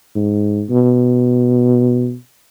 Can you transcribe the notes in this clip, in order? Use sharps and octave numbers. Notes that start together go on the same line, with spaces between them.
G#2
B2